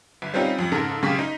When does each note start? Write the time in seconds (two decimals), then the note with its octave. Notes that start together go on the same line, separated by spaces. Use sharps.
0.22 G1
0.34 G3 C4 C#4 D#4 F4
0.59 F2
0.72 G#2 C#3 A4 A#4
1.02 F#2 C#3 A#3 G4 C#6 B6
1.19 D#4